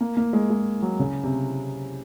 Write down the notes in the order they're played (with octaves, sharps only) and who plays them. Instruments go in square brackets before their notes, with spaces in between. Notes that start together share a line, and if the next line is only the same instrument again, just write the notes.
[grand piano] A#3
A#3
G#3
G#3
F#3
C#3
C3